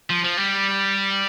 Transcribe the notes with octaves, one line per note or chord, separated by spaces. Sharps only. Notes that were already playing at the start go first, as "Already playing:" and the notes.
F3
F3
G3